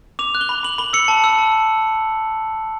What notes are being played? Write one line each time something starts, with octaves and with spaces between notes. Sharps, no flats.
D6 F7
F#6
G7
B5
B5 F#7
B5 G7
E6 C#7
A5
E6
A5